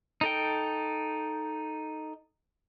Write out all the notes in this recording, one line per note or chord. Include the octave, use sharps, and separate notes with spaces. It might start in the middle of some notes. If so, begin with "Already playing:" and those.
D#4 A4 G5